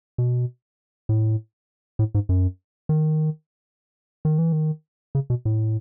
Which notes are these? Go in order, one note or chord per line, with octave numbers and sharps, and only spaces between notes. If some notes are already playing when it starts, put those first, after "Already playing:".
B2
A2
A2
G#2
F#2
D#3
D#3
E3
D#3
C#3
B2
A2